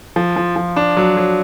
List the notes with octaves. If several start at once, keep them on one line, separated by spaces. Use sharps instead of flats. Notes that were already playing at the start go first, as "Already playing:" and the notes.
F3
F3
F3
D4
F#3
F#3